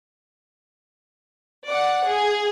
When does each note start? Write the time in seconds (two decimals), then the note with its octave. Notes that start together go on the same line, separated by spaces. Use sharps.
1.65 D5 F#5
2.05 G#4